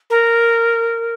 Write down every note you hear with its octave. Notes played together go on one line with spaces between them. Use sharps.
A#4